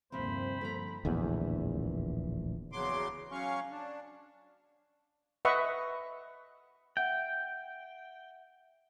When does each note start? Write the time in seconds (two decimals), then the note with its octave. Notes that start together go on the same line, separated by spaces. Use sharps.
0.12 G1 D#2 C3 F3 A#3 C4 C5 B5
0.61 D3 F3 A#5
1.05 D1 A#1 E2
2.72 E2 C#3 F#3 C6 D6
3.31 F#3 C#4 F5 C#6
3.71 D4
5.45 B4 D#5 E5 F#5 C#6
6.97 E5 F#5 G5